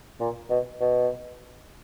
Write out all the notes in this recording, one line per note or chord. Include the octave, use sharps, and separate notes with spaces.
A#2
B2
B2